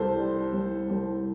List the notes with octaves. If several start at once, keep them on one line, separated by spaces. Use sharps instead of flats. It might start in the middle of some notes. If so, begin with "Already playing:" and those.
Already playing: C2 A4 C5
G3
C2
C2